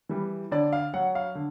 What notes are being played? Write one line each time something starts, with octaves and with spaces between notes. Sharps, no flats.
E3 G3
D3 D5
F5
F#3 F#5
F5
D3